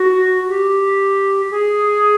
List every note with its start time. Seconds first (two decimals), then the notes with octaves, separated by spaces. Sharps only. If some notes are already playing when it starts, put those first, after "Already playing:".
Already playing: F#4
0.48 G4
1.50 G#4